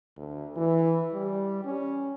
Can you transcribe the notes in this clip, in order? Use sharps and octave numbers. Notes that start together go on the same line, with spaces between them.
D2
E3
G3
C#4